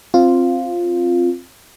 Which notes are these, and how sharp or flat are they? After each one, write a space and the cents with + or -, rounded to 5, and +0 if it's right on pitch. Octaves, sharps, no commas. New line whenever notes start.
C4 +10 F4 +0